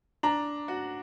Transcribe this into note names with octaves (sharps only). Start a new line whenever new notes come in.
D4 A#5
F#4